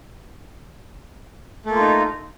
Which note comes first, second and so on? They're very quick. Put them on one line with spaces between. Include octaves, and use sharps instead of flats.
A3 A#3 F4 D#4